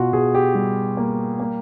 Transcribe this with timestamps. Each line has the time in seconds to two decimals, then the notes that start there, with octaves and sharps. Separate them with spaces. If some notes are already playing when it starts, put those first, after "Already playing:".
Already playing: B2 F4 F#4
0.13 B2 G#4
0.34 G4
0.55 G3
0.97 A#3
1.40 A#3